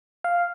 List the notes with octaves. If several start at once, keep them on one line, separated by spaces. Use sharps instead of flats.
F5